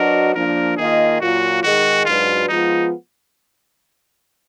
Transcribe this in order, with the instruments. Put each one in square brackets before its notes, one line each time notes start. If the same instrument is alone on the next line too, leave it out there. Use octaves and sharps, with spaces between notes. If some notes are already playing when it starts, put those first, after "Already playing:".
Already playing: [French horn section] F#3 D4 F#4 B4 D#5 [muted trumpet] A#4
[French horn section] F3 A#3 D4 [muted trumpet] A#4
[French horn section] D#3 A#3 F4 A#4 D#5 [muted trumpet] G#4
[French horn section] A#2 F#3 A#3 F4 [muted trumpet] F#4
[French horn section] D#3 G#3 D#4 G#4 D#5 [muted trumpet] F#4
[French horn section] G#2 F#3 D4 F#4 B4 [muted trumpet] F4
[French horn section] F3 G#3 B3 F4 [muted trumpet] D#4